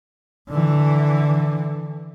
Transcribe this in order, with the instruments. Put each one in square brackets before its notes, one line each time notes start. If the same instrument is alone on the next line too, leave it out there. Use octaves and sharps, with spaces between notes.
[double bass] D3 E3